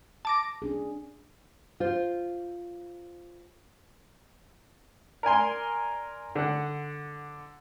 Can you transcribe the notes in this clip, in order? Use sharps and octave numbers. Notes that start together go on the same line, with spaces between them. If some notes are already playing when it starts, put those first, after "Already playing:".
A5 D6 A#6
C#4 D4 G#4
F4 C5
A#4 D5 G#5 C6
D3 F#5